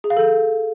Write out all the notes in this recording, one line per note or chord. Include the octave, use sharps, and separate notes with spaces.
G#4
F5
A4